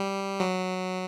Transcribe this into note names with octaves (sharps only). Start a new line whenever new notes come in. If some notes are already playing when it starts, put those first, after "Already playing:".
Already playing: G3
F#3